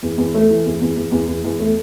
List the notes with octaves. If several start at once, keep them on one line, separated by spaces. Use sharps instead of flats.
E2
E2
A3
E3
E2
E2
E2
E2
E2
E2
A3